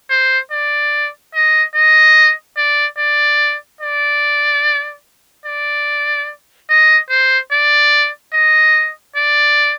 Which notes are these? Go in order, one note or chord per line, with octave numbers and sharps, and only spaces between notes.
C5
D5
D#5
D#5
D5
D5
D5
D5
D#5
C5
D5
D#5
D5